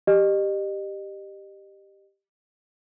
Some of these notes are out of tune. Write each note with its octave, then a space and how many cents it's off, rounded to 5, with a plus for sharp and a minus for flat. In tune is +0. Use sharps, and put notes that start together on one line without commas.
G4 +0 D#5 -35